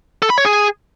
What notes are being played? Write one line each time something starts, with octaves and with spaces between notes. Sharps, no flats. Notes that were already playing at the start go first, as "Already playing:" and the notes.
A4
B5
C#5
G#4